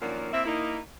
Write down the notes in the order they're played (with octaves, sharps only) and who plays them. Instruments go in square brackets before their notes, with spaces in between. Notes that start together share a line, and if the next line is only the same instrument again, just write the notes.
[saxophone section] F#2 D#3 F3 F#3 A#3 D4
A#3 C4 E4 E5
A#3 D#4 E4